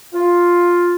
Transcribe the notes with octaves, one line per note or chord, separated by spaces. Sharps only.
F4